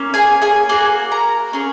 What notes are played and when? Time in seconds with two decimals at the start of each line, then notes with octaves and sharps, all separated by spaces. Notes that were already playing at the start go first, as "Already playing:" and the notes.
Already playing: A#3 C#4
0.14 G#4 G#5
0.42 G#4 G#5
0.69 A#3 F#4 G#4 G#5
1.12 A#4 A#5
1.53 C#4 G#4